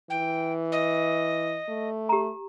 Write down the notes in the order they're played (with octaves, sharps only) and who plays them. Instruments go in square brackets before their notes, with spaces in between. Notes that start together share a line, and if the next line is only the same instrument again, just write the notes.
[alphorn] E3 [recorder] G5
[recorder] D#5
[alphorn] A3
[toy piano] G4 A#5